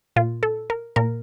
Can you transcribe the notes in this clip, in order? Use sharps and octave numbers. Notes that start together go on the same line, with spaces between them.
A#2 F4
A4
A#4
A#2 A#4